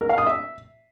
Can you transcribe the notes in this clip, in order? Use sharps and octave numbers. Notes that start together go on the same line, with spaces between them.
A#4
F5
D#6
E5